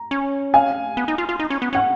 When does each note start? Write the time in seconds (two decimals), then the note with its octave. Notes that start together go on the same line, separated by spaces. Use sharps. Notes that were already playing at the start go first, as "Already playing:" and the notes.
Already playing: A#5
0.11 C#4
0.54 F5 G#5
0.97 B3
1.08 D#4
1.18 F4
1.29 F4
1.39 D#4
1.50 C#4
1.62 B3
1.73 C#4 F#5